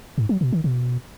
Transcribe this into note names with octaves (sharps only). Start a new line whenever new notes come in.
G#2
F#3
B2
D#3
B2